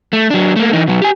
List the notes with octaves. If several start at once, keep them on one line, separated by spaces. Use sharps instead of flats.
A3
F#3 D4
A3 A#3
E3 D#4
B2 F#3
G4 G#5